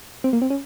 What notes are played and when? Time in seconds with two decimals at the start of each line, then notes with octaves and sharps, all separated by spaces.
0.24 C4
0.33 A#3
0.42 C4
0.50 C#4